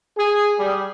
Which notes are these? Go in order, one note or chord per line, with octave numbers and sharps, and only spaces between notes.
G#4
G3